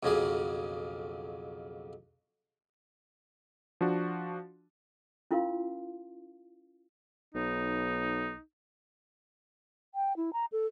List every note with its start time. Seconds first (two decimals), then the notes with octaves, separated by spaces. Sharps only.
0.03 B1 F2 C#3 F#3 A#3 G#4
3.81 F3 D4 F#4
5.31 C#4 E4 F4 A#4 F5 C6
7.35 B1 D#4
9.95 G5
10.17 E4
10.33 A#5
10.52 A4